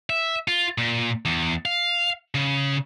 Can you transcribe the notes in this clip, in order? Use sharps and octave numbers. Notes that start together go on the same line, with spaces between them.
E5
F4
A#2
E2
F5
C#3